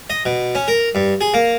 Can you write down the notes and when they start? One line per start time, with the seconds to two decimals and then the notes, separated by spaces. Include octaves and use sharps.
0.10 D#5
0.25 B2
0.55 C#4
0.68 A#4
0.95 G2
1.21 G#4
1.34 A#3